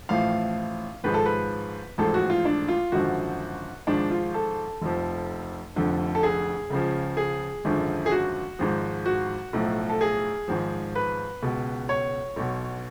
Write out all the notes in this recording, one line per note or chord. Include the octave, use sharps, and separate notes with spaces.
A1 A2 F3 F5
G#1 G#2 F3 B4
A4
B4
A1 G#2 F3 A4
F#4
F4
D4
F4
G#1 F#2 D3 F3 F#4
G#1 G#2 F3 D4
F4
A4
F1 F2 F3
F1 F2 D3 F3
A4
G#4
C#2 C#3 F3
G#4
G#1 F#2 D3 F3
G#4
F#4
G#1 G#2 F3
F#4
B1 A2 F3
A4
G#4
G#1 G#2 F3
B4
C#2 B2
C#5
B1 B2